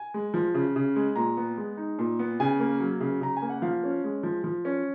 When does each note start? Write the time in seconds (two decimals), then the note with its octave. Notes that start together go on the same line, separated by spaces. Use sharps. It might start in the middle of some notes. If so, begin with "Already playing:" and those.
Already playing: G#5
0.14 G#3
0.34 F3
0.54 C#3
0.76 C#3
0.96 G#3
1.16 A#2 A#5
1.37 B3
1.58 G#3
1.77 D#4
1.99 A#2
2.19 B3
2.40 C#3 G#5
2.60 A#3
2.80 F#3
3.01 C#3
3.21 C#3 A#5
3.36 G#5
3.42 A#3
3.49 F#5
3.62 F3 F5
3.84 C#4
4.04 G#3
4.23 F3
4.44 F3
4.65 C#4